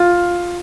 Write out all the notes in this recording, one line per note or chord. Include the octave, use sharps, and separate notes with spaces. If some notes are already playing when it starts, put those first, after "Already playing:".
Already playing: F4